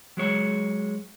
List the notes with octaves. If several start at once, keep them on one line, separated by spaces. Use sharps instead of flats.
F#3 G#3 C#5